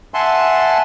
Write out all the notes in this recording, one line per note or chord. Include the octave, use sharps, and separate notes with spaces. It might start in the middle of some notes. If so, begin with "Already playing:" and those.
E5 F#5 G#5 A5 C6